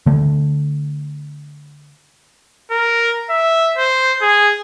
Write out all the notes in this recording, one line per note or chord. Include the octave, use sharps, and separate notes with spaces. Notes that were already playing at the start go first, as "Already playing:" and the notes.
D3 A3
A#4
E5
C5
G#4